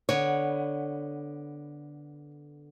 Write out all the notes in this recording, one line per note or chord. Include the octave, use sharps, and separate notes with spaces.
D3 B3 C#5